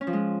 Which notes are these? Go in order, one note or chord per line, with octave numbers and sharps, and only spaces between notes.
C#4
F3
G#3